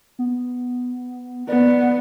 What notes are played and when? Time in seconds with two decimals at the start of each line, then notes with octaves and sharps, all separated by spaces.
0.19 B3
1.49 B3 D5